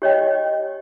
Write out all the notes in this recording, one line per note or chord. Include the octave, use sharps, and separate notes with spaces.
G4 C#5 D#5 G5